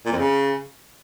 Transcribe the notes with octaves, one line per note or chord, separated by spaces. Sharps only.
A#2
F2
C#3